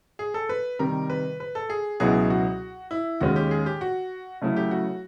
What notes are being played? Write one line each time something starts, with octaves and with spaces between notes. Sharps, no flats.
G#4
A4
B4
C3 D#3 G3 A#4
B4
B4
A4
G#4
C#2 B2 F#3 B3 E4 G#4
F#4
E4
D#2 D#3 G#3 C#4 F#4
G4
G#4
G4
F#4
C#3 F#3 A3 C#4 E4
G4
F#4